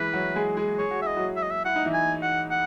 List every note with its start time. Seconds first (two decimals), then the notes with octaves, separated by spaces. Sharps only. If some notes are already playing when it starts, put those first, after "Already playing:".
Already playing: E3 G#3 E4 G#4 B4
0.13 F#3 F#4
0.35 G#3 G#4
0.57 G#3 G#4
0.78 G#4 C#5
0.91 F#4
1.02 E5
1.04 E4 D#5
1.17 F#3 F#4
1.36 E5
1.43 D#5
1.51 E5
1.65 E4 F#5
1.76 D#4
1.85 E3 E4
1.94 G#5
2.22 F#5
2.51 F#5